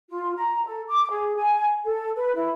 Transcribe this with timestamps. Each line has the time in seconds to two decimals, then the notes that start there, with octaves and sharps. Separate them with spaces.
0.09 F4
0.36 A#5
0.65 A4
0.87 D6
1.09 G#4
1.35 G#5
1.84 A4
2.15 B4
2.34 E4